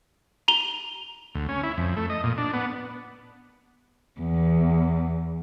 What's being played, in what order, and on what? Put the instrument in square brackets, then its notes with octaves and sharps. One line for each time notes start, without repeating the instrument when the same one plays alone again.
[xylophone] A#5 F7 G7
[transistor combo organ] D2
C#4
E4
F2
A3
D#5
A#2
D4
B3
[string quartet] E2